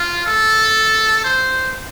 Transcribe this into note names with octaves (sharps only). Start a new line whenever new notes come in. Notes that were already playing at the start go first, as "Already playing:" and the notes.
Already playing: F4
A4
C5